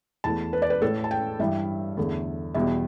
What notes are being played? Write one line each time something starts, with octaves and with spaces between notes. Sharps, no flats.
E2 E3 A3 A5
B4
D5
B4
A2 A3 A4
A5
G5
G2 E3 G3 E5
E2 D3 A3
E2 B2 G3 E5